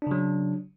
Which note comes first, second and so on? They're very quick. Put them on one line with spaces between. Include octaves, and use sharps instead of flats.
D4 C#3 F#3